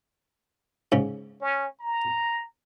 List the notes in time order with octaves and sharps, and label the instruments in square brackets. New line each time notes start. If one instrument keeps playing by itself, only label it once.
[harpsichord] G#2 C#3
[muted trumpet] C#4
A#5